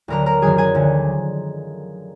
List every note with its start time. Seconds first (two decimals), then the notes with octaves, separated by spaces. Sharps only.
0.08 D2 D3 F#3 A#4 A#5
0.26 A#4 A#5
0.42 F#2 D#3 F#3 G#4 G#5
0.58 G#4 G#5
0.75 D2 D3 F3